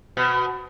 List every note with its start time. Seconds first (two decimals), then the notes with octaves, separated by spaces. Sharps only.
0.17 B2